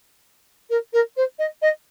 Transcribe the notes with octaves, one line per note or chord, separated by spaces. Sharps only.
A#4
A#4
C5
D#5
D#5